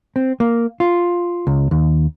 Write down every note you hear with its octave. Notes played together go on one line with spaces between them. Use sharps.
C4
A#3
F4
C#2
D#2